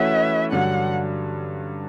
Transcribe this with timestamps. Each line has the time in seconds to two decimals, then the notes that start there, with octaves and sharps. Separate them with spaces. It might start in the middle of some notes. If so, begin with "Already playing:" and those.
Already playing: E3 A3 C#4 F#4 B4 E5
0.52 G2 D3 F#3 F#5